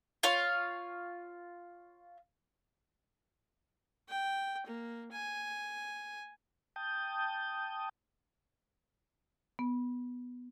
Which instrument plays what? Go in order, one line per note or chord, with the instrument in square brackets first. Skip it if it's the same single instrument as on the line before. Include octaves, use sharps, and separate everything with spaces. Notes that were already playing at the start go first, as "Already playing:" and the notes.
[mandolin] F4 C#5 F5
[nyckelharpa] G5
A#3
G#5
[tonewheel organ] G5 A5 D#6 G6
[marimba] B3